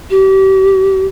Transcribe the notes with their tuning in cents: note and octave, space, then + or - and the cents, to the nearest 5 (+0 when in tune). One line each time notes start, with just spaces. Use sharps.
G4 -35